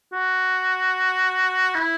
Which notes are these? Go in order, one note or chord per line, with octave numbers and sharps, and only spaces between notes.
F#4
E4